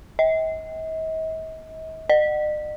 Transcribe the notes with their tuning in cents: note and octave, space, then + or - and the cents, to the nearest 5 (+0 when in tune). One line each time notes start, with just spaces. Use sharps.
D#5 +45
D#5 -45